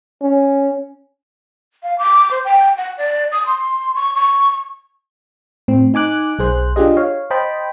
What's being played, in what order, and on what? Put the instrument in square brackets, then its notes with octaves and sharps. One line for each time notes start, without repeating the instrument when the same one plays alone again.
[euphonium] C#4
[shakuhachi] F5
D6
C5
G5
F#5
D5
D#6
C6
C#6
C#6
[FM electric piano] A2 C4
D#4 G#5 D6 F#6
B1 G#4 C5 F#6
D4 F4 G4 G#4 D#5
C#5 F5
C5 D#5 G5 A5 B5